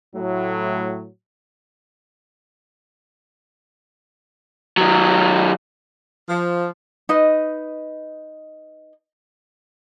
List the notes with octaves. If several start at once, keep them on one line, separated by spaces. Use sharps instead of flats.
A2 F#3
D#3 F#3
F3
D#4 B4 D#5